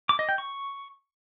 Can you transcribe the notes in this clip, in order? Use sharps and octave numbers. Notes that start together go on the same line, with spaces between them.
D6
D#5
G5
C#6